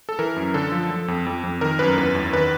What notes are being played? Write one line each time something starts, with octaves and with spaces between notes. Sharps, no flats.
A4
E3 A#4
F#2
D3 A4
F3
F3
F2
F2
F2
D#3 A#4
F#2 B4
E2 B4
E2
D#3 B4